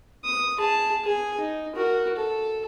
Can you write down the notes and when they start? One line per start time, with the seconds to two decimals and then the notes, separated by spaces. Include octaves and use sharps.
0.24 D#6
0.57 G#4 A5
1.04 G#4 G#5
1.40 D#4
1.75 F#4 A#4
2.16 A4